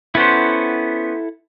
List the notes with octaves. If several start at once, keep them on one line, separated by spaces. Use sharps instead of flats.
B3 C#4 E4 A4 C5 F#5